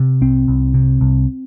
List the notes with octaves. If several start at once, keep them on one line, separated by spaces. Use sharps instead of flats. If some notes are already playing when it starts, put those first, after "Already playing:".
Already playing: C3
C2 C4
C2
C3
C2